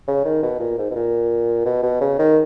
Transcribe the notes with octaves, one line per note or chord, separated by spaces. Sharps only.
C#3
D#3
B2
A#2
G#2
B2
A#2
B2
B2
C#3
D#3